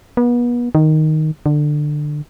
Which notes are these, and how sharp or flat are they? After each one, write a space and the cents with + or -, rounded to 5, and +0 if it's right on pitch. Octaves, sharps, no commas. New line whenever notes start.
B3 -35
D#3 +0
D3 +20